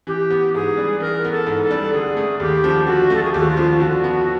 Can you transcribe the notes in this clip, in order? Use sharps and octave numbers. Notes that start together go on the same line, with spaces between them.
E3 G4
B3
G#2 G#4
G3
E3 A#4
B3
A4
G#2
A4
G3
D3 G#4
A3
D#2 G4
F3
D3 F#4
A3
A4
G#4
D#2 G4
F#4
F4
F3
D3 F#4
B3